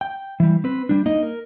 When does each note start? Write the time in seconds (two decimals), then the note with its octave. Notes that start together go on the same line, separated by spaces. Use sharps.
0.01 G5
0.40 E3 G3
0.64 C4 B4
0.89 G3 D4
1.06 A#3 D#4 D#5
1.23 A#4